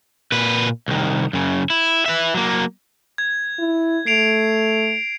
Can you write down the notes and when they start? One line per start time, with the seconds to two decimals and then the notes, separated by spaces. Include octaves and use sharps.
0.32 A#2 B4
0.88 C2 D#3
1.33 F#2 C#3
1.70 E4
2.06 B4 E5
2.34 F#3 A#3
3.18 G#6
3.59 E4
4.06 A3 C7 D7 F7